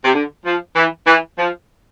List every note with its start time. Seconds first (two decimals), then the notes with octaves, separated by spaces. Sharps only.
0.04 C3
0.14 D3
0.45 F3
0.76 E3
1.07 E3
1.38 F3